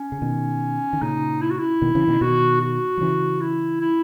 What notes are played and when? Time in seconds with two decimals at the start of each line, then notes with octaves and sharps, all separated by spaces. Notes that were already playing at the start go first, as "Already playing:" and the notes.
Already playing: C#4
0.12 C#3
0.22 B2 D#3
0.93 D#3
1.01 A#2 C#3 D#4
1.41 E4
1.50 F#4
1.59 E4
1.82 B2 D#3
1.95 C#3 E3
2.07 B2 D#3
2.21 B2 D#3 F#4
2.61 F#4
2.97 F#3
3.01 C#3 E3
3.41 E4
3.81 E4